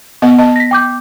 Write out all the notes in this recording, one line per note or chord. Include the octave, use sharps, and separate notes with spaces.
B3 D#5 F#5
D#5 A5
A#6 B6
G5 D6 G6